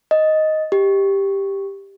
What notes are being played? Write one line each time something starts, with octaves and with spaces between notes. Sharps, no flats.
D#5
G4